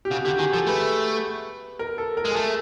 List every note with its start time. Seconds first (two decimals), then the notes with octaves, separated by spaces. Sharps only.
0.05 G4
0.11 C#3 F#4
0.25 D3 G4
0.39 D#3 G#4
0.53 F3 A4
0.67 A3 B4
1.79 A#4
1.98 A4
2.17 A#4
2.25 G#3
2.31 G#4
2.35 A3 A4